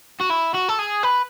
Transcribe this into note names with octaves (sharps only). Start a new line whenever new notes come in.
F#4
E4
F#4
A4
G#4
B4